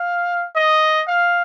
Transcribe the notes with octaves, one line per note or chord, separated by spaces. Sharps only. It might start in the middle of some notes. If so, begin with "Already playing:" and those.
Already playing: F5
D#5
F5